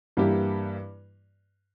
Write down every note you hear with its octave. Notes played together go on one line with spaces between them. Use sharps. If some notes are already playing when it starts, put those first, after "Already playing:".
G2 E3 A#3 E4 G4